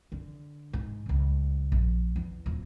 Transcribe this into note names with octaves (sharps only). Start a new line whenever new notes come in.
D3
G#2
D1 C#2
A#1
E2
D1 F4